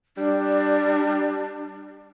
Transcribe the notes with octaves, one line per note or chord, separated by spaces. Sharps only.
G3 D4